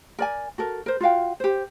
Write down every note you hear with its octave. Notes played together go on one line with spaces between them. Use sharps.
A#4 D5 G#5
F#4 A4 A#4
A#4 C5
F4 F#4 F5 G5
G4 C5